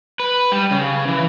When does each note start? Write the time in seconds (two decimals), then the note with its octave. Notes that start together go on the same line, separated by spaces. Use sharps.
0.20 B4
0.52 G3
0.71 C#3
1.08 E3